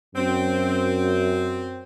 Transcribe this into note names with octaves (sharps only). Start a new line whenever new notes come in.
F#2 C4